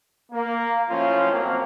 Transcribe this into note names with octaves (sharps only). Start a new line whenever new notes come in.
A#3
F#2 A2 F3 C#4 F4
F2 F3 F#3 A#3 C4